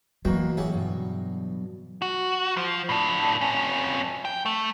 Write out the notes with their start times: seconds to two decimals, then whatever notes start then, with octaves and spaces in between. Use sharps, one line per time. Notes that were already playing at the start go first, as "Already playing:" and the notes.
0.25 E2 B2 F#3 A#3 F#4 G5
0.57 A1 G4 G#4 C#5 E5 F#5
0.73 G2 B2
2.02 F#4
2.57 F3
2.89 A2 D4
3.41 F2 C#4
4.25 G5
4.46 A3